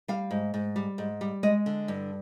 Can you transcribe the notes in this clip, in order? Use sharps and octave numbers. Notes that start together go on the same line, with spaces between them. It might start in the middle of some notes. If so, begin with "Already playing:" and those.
G3 F5
G#2
G#2
G3
G#2
G3
G#3 D#5
D3
G2